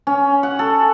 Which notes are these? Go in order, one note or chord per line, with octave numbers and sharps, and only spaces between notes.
C#4
F#5
A4